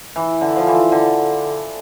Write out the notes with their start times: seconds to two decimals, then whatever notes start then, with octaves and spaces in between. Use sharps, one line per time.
0.16 E3
0.41 D3
0.56 F3
0.67 E3
0.92 D3